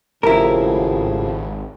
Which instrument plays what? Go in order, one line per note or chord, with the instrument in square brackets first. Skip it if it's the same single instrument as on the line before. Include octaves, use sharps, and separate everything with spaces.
[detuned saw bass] G#1 [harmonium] A2 C#3 F3 [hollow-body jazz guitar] E4 A#4 [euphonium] G4